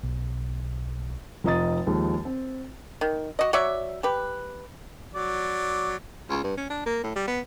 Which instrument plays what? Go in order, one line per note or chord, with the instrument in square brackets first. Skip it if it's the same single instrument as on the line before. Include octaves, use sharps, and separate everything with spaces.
[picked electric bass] B1
[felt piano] F1 F4 D#5 A#5 D#6 A6
D#2 F3 G#3
C4
[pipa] D#3
F#4 D#5
F#3 C#5 D5 E5
G4 B4
[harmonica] F#3 D5
[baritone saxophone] C#2
G2
C#4
D4
A#3
A2
G3
B3